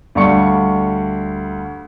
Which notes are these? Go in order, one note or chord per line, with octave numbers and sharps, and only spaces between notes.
D2 G3 D5 F5 C#6 C#7